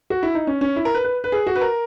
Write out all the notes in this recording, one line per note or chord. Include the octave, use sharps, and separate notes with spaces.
F#4
E4
D#4
C#4
C#4
E4
A#4
B4
B4
B4
G#4
F#4
B4
A#4